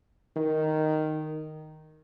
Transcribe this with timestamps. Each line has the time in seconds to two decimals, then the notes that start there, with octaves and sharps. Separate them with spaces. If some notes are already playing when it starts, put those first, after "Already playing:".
0.36 D#3